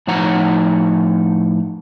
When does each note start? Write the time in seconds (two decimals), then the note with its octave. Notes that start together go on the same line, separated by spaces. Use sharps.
0.07 A2 F3 D#4 C#5 F#5 A#5